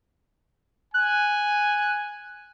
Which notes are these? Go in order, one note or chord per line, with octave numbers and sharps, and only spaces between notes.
G#5 F#6